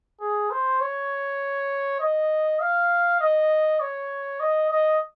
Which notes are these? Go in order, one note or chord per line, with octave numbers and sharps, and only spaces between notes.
G#4
C5
C#5
D#5
F5
D#5
C#5
D#5
D#5